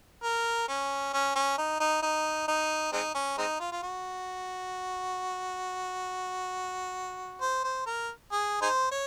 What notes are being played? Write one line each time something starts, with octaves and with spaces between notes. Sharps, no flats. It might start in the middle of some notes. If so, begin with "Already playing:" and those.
A#4
C#4
C#4
C#4
D#4
D#4
D#4
D#4
G#3 C4 D#4
C#4
G#3 C4 D#4
F4
F4
F#4
C5
C5
A#4
G#4
D#4 G#4 C5
C#5